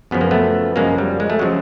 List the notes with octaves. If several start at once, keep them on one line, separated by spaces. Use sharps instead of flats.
F#2 C#3 F3 B3
A#3
A3 B3
F#2 C#3 F3 G#3 A#3
G3
G#3
A3
C#3 F3 F#3 G#3